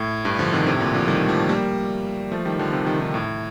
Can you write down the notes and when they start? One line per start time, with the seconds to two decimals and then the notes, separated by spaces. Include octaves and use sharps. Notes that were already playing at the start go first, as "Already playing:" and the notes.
Already playing: A2
0.25 G2
0.39 D3 F3
0.52 C3 D#3
0.67 A2 C3
0.80 A#2 D3
0.94 D3 F3
1.08 D#3 G3
1.28 F3 A3
1.49 G3 A#3
2.32 F3 A3
2.45 D#3 G3
2.59 D3 F3
2.73 C3 D#3
2.86 D#3 G3
3.00 C3 D#3
3.14 A2